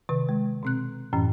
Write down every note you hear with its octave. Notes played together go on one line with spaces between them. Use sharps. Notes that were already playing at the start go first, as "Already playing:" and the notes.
C3 D#3 B4
G#3
B2 C4 F#6
F#2 A2 E3 C#4